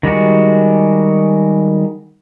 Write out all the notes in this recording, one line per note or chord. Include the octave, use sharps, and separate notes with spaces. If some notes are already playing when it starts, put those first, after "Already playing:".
D#3 G3 G#3 F#4